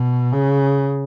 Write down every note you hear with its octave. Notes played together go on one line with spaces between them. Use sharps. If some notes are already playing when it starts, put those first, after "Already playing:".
Already playing: B2
C#3